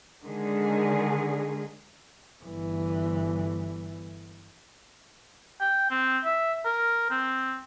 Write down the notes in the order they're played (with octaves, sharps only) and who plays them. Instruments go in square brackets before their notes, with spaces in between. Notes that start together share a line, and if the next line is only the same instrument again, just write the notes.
[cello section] D3 D#3 G#3 G#4
[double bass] G1 E3
[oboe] G5
C4
E5
A#4
C4